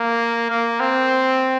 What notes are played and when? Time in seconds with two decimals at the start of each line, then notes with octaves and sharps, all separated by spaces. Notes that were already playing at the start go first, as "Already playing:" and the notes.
Already playing: A#3
0.50 A#3
0.80 C4